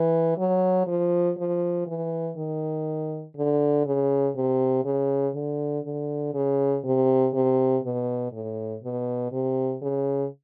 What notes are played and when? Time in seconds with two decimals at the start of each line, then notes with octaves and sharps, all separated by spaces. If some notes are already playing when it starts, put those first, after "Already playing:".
Already playing: E3
0.38 F#3
0.87 F3
1.38 F3
1.87 E3
2.37 D#3
3.36 D3
3.86 C#3
4.36 C3
4.85 C#3
5.35 D3
5.85 D3
6.34 C#3
6.84 C3
7.34 C3
7.83 B2
8.32 A2
8.83 B2
9.32 C3
9.82 C#3